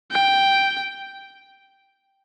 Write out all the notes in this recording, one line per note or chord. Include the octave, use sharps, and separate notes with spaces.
G5